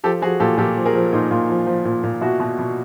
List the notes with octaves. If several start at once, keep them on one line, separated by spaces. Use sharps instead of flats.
F3 G4 A4
F3 F#4 G#4
A#2 G4 A4
A#2 G4 A4
F3
G#4 A#4
F3
A#2 D#4 F4
A#2
F3
F3
A#2
A#2
B2 E4 F#4
B2
B2